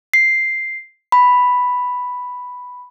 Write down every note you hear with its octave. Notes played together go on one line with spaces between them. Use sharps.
C7
B5